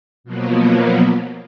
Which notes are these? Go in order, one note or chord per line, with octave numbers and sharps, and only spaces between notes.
B2 F3 F#3 A#3 B3